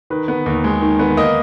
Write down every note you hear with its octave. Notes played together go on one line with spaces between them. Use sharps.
D#3 B4
B3
D#2
G#3
D#3
B3
A#3 D#5